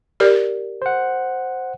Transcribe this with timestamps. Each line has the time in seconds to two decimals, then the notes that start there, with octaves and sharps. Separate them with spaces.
0.20 G4 A#4 D5
0.82 C5 F#5